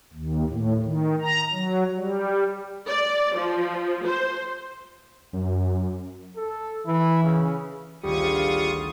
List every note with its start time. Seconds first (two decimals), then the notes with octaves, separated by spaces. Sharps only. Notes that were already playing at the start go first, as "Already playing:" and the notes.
0.14 D#2
0.49 A2
0.83 D#3
1.22 A#5
1.53 F#3
1.96 G3
2.88 D5
3.35 F3
4.05 C5
5.33 F#2
6.36 A4
6.87 E3 E4
7.23 C#3
8.04 G#1 D2 G3 F4 C#6 D#6